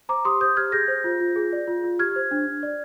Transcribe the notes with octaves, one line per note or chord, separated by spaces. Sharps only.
C5 A#5 D6
G4 C6 D#6
C5 D#6 G6
G4 F6 G#6
G#4 G6 A#6
C5
F4
F4
G#4
D5
F4
F4
G4 F6 G#6
C5
D4
D4
D5